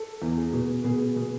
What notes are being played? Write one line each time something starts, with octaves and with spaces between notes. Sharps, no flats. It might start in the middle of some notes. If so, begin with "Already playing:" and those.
Already playing: A4
E2
G#4
B2
B2 G#4
B2